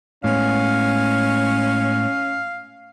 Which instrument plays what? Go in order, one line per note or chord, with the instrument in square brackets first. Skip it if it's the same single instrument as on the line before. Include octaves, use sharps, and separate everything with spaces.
[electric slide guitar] A2 G#3 B3 [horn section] C#4 [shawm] F5